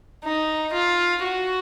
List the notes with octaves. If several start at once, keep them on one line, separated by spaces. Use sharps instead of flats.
D#4
F4
F#4